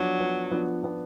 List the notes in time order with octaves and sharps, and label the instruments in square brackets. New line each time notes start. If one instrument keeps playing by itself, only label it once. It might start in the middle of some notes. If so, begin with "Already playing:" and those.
Already playing: [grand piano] F3 B3 D4 [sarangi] F#3
[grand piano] F3 B3 D4
F3 B3 D4
F3 B3 D4